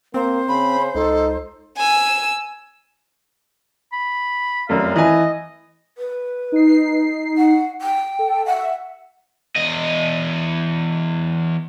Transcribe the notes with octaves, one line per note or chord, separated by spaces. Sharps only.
A#3 C4 C5
C#3 B5
C#2 D#4 A4
G#5 E6
B5
F1 F#2 F5
E3 D#5 G#5
B4
D#4 C7
F#5
G5
A4
E5 F#5
E2 D#5